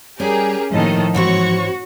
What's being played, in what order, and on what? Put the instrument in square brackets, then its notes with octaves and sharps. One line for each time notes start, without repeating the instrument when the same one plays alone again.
[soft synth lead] G3 [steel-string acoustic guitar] C#4 [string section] G4 G#4 A#4
[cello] A2 D#3 [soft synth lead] F3 [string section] A#3 A4 D#5
[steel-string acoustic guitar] G#2 E3 C4 [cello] F#4 [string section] C#5 C#6